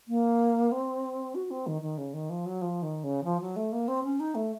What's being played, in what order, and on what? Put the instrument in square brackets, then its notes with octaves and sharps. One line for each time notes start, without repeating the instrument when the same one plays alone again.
[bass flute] A#3
C4
F#4
C4
D#3
D#3
C#3
D#3
F3
F#3
F3
D#3
C#3
F3
F#3
A3
A#3
C4
C#4
D#4
A3